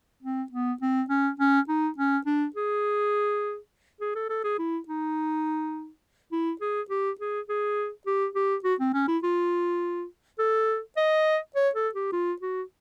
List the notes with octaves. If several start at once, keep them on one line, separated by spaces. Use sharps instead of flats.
C4
B3
C4
C#4
C#4
D#4
C#4
D4
G#4
G#4
A4
A4
G#4
E4
D#4
E4
G#4
G4
G#4
G#4
G4
G4
F#4
C4
C#4
E4
F4
A4
D#5
C#5
A4
G4
F4
F#4